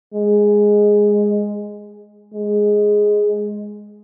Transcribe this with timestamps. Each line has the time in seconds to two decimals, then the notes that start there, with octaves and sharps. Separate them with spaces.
0.14 G#3
2.33 G#3